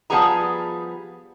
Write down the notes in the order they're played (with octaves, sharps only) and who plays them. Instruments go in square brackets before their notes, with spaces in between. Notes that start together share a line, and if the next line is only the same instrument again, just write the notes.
[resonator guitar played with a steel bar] F3 G3 B3 F#4 G#4 A#5